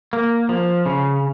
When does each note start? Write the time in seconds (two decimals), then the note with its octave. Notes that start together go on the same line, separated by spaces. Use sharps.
0.13 A#3
0.49 F3
0.86 C#3